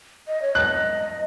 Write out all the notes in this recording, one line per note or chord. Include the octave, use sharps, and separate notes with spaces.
D#5
C#5
D#5 F#6